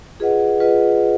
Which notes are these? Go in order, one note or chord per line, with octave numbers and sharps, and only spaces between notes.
F4 G#4 B4 D#5 F#5
F4 G#4 B4 D#5 F#5